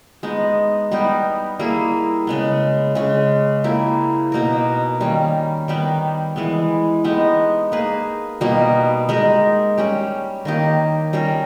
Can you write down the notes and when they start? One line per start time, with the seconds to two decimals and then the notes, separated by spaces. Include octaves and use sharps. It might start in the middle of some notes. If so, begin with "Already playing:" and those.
0.23 G#3 B3 D#4
0.92 G3 B3 D#4 G4
1.59 G3 A#3 E4 G#4
2.27 C#3 G#3 B3
2.95 C#3 G#3 C#4
3.64 A#3 E4 G4
4.32 B2 A#3 D#4 A#4
5.00 D#3 G3 A#3 C#4
5.68 D#3 G3 B3 G4
6.36 E3 G#3 B3
7.04 G#3 B3 D#4 G4
7.72 A#3 D#4 G#4 B4
8.41 B2 G3 A#3 D#4
9.09 G#3 D#4 G4 A#4
9.78 G3 C#4 G4
10.45 D#3 A#3 D#4 G4
11.13 G3 C#4 G4 A#4